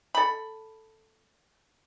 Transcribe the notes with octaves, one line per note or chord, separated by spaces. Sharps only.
A4 B5